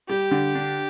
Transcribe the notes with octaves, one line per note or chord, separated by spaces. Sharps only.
G3 G4
D3
D4